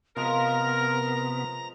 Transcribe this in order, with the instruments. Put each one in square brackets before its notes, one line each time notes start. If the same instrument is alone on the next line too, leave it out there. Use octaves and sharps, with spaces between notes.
[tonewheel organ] C3 B3 [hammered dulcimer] F3 G#3 [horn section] A#4 [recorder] A#5